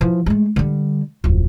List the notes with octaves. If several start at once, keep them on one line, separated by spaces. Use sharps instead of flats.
E3 F3
G#3 A3
D3 G3
D1 F2